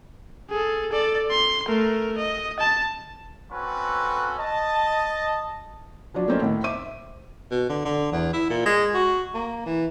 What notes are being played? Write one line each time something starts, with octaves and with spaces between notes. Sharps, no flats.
G#4 A4
A4 D5
C6
A3 A#4
D#5
A5
A3 C4 C#4 F#4 A4 B4
D#5 A5
F3 F#3 D4 F#4
A3 A#3 C4 C#4 D#4
A2 D#3
C5 E5 D6 D#7
B2
D3
D3
E2
E4
A#2
G#3
F#4
A#3
E3